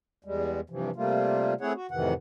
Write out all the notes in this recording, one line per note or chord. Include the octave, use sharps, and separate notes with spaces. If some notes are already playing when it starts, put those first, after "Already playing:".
E2 G3 G#3
G2 C3 E3 F3
C3 G3 A3 A#3 F4
A3 C4 E4 G#4 C#5 F#5
F#4
F2 A2 C3 D#3 E3 F#5